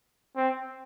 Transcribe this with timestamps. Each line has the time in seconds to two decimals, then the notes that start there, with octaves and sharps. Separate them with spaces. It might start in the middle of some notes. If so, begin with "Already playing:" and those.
0.36 C4